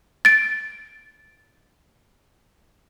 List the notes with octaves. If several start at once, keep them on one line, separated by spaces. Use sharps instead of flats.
A6 D7